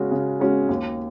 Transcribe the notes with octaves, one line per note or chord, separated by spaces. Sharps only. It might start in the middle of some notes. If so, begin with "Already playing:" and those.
Already playing: C#3 G#3 C#4 F#4
C#3
G#3 C#4 F#4
D#2